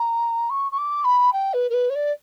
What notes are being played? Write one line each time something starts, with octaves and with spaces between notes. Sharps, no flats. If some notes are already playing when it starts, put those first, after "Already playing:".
Already playing: A#5
C#6
C#6
D6
B5
G5
B4
A#4
B4
C#5
D5